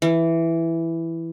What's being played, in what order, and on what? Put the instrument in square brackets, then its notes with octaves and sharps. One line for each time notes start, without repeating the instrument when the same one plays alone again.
[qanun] E3